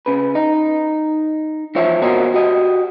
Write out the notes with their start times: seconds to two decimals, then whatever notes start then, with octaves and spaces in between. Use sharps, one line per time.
0.06 C#3 B4
0.35 D#4
1.75 E3 F3 F4 C5 C#5 E5
2.02 B2 A#3 F#4 A#4 C5 D#5
2.34 F#4 G4 D#5